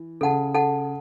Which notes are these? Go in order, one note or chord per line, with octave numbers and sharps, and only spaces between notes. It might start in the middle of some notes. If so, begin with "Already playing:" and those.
Already playing: E3
C#3 A4 F#5 A5
A4 F#5 A5